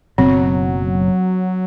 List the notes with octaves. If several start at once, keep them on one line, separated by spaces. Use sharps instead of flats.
F#1 B2 F#3 C4